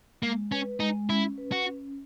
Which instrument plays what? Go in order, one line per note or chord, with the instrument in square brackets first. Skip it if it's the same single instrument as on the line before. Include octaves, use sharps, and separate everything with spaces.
[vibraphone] G#3 [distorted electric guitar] A#3
[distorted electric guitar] C#4 [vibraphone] B4
[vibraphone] G#3 [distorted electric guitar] D#4
[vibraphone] C#4 [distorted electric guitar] E4
[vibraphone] B4
[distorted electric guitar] F#4
[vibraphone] C#4